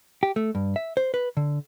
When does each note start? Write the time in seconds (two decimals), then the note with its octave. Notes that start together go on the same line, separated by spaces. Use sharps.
0.23 G4
0.36 A3
0.55 G2
0.76 E5
0.97 C5
1.14 B4
1.37 D3